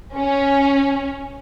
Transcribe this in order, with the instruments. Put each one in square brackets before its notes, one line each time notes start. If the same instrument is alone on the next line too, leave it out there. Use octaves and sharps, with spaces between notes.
[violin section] C#4